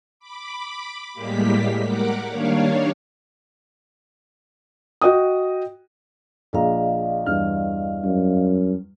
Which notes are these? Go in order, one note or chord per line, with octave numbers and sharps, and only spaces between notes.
B5 D6
A2 G3 G#3 A#3 G4 B6
A#4 F#5 D6
D#3 G3 A#3 D4 C#5 F5
F#4 D#5 G5 D#6
A#1 G#4 D5 D#5 F5 A#5
E2 G2 F6
F#2